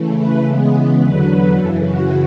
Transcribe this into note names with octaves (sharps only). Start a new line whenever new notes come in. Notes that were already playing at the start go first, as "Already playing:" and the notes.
Already playing: C#3 E3 A3
B4
C#3 E3 G#3 B3
E2 D3 F#3 B4
F#2 C#3 E3 A4
F#4